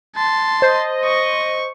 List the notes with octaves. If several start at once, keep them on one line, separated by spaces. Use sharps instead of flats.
A5 C6
C5 D#5
C#6